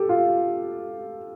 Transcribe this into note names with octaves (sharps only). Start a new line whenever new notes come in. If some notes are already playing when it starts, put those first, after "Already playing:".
Already playing: G4 A4
F4